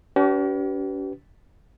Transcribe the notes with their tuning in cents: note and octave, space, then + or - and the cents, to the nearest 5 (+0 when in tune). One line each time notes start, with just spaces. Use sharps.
C#4 +45 G4 -45 B4 +0